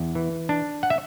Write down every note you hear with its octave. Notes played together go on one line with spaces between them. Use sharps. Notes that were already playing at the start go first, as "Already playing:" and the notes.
Already playing: E2
E3
D4
F#5
E5